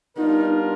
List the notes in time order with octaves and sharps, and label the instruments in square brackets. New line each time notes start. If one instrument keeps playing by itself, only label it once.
[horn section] G3 B3 D4 F4 A#4 [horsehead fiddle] D#4